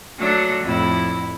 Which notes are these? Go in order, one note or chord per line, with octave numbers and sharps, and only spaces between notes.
F#3 A3 D4
F2 A2 E4